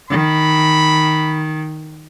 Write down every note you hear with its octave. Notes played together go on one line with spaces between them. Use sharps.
D#3 B5